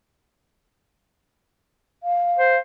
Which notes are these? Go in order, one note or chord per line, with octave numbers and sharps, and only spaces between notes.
F5
C5